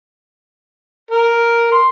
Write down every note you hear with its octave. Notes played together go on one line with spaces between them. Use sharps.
A#4
C6